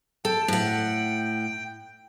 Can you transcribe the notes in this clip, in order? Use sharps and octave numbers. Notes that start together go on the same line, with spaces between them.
A4 G5
A2 F#5